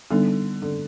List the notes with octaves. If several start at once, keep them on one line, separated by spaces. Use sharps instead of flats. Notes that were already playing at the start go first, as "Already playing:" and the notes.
D3 G3 B3 D#4
D3